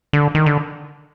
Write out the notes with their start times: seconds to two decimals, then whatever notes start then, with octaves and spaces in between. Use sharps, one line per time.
0.13 D3
0.35 D#3
0.46 D3